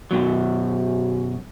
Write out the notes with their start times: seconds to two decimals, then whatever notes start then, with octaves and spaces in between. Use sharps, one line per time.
0.11 F#2 B2 F#3